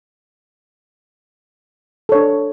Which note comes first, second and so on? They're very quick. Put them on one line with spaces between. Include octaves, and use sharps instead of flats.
A4 C#5 D4